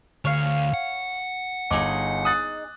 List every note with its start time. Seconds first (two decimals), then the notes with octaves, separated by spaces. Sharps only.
0.25 D2 C#5 F5
0.73 F#5
1.71 G1 D#4 G#4 D#5 D6
2.25 D#6 F#6 A6